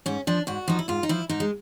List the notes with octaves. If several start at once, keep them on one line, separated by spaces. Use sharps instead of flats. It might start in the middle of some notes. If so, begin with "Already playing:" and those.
G#2 C#4
F3 D4
G#2 F#4
F3 D#4
E4
G#2 F4
D#4
F3 E4
G#2 D#4
G#3